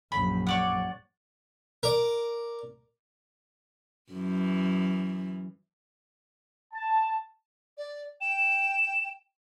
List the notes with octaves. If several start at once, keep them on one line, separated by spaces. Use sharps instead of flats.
A#1 F#2 B5
C#5 D5 F#5
A#4 D5
F#2 E3
A5
D5
G5 E7